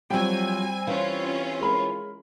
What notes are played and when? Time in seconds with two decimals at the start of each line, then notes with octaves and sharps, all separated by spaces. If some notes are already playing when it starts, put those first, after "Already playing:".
0.10 F2 F#3 G3 C4 G5 G#5
0.87 E3 C#4 F4 F5
1.61 G#3 A#4 B5